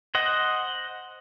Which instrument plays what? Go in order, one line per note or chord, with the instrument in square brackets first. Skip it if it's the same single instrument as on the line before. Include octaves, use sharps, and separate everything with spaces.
[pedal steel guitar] C5 D#5 F#5